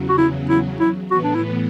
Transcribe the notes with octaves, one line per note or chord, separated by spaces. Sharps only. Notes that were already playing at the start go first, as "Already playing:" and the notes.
Already playing: E2 C#3 F#3
F#4
E4
E4
E4
A2 E3 B3 F#4
D4
E4